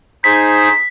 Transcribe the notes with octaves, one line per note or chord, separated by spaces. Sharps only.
D#4 G#4 C5 B6